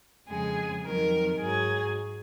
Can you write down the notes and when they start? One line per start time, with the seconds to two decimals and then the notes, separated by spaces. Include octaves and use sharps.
0.28 F2 C#3 G#3 G#4
0.84 F2 D#3 F#3 A#4
1.39 G#2 F#3 G#4